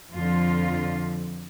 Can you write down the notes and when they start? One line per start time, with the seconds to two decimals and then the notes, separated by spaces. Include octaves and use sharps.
0.13 F2 D3 F3 F4